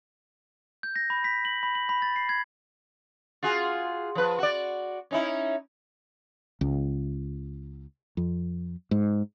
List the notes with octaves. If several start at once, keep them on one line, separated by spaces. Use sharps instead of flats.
G6
A#6
B5
B6
F#7
B5
F#7
B5
A6
C7
G#6
F4 F#4 G#4
F3 B4
F#4 D5
C#4 D#4 E4
C#2
F2
G#2